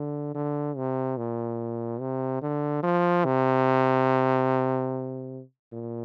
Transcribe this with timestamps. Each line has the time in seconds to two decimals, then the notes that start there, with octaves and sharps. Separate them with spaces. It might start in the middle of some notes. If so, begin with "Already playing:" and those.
Already playing: D3
0.35 D3
0.77 C3
1.18 A#2
2.01 C3
2.42 D3
2.83 F3
3.25 C3
5.73 A#2